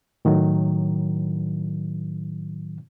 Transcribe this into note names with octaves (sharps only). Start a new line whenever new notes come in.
A2 D#3 F#3